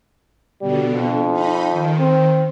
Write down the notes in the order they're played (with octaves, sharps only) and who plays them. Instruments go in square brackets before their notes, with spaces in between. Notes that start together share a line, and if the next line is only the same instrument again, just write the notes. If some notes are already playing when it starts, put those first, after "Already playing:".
[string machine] B2 D3 [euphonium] G3
[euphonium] F2
[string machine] D#4 B5
D#3
[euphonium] C4